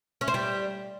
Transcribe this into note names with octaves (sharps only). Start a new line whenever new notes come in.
C#4
C5
G3